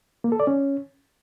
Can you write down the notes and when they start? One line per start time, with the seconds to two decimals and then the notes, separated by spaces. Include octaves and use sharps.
0.24 A#3
0.32 A4
0.40 D5
0.47 C#4